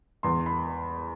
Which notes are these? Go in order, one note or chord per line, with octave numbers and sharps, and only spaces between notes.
E2 C6
B5